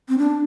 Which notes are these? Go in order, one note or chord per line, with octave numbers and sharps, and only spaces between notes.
C4
D4